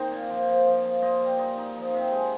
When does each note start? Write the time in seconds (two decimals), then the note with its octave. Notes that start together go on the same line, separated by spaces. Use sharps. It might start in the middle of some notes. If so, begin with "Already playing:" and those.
Already playing: D#3 A#3 C4 D#4 C5
0.11 A#2
0.30 F3
0.47 F3
0.66 F3
0.84 F3
1.02 A#2 C5 D#5
1.20 G3
1.39 D#4 C5 D#5
1.57 D#4
1.75 F3
1.93 C3
2.12 G#3